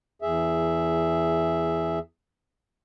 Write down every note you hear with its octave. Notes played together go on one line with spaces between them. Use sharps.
E2 G#4 E5